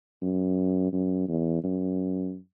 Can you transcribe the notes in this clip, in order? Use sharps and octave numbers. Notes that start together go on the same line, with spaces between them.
F#2
F#2
E2
F#2